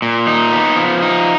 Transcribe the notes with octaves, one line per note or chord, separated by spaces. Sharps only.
A#2
D#4
B3
F3
D#4